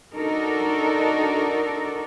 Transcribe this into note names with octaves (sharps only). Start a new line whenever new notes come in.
D4 D#4 F#4 A4 A#4